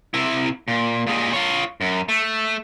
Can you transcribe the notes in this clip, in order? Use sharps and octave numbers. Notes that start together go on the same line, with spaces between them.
C3 E4
A#2
A#2 G#3
F4 C#5
F#2
A3